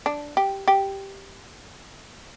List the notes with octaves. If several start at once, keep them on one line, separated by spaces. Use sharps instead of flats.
D4
G4
G4